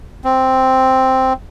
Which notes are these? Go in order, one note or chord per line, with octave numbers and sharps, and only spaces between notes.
C4